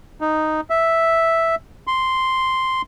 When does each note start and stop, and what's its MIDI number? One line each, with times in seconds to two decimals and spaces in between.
0.21 0.61 63
0.70 1.55 76
1.87 2.82 84